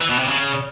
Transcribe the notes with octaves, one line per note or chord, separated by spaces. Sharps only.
E3
B2
C3
C#3